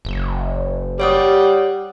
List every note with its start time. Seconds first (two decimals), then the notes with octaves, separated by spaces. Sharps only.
0.05 F#1
1.00 G3 C#5 F#5 D#6